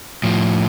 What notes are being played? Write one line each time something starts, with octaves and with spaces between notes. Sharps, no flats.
A2 F3